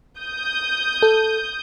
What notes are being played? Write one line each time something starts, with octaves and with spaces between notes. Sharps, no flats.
D#6 G6
A4